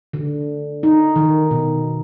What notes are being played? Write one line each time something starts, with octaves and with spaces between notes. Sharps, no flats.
D3
D#4
D#3
B2